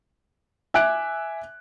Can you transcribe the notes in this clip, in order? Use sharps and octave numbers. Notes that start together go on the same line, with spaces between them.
E5 G#5 D6 F#6 D7